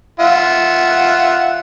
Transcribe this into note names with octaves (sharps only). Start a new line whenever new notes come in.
F4 E5 F#5